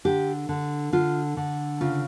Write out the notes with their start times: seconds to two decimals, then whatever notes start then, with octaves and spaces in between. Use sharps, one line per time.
0.05 D3 G4
0.49 D3
0.93 D3 F4
1.37 D3
1.81 C#3 F4